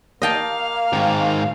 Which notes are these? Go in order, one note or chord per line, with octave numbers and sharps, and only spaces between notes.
A#3 D#5 F5 G5 A5
G#2 D#3